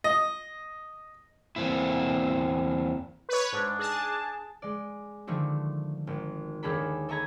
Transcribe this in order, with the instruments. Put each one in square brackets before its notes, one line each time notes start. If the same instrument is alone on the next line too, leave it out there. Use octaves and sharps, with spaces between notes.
[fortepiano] D#5
[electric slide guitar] E2 A#3 C4 E4
[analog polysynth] B4 C#5
[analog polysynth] G#2 [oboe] D4
[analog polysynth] G#4 A5
[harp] G#3 D5
D3 D#3 F3 A3 D4
G#1
D#2 D#3 D4 G#4 A4 B5
A4 C#5 D#5 A#5 B5 G#6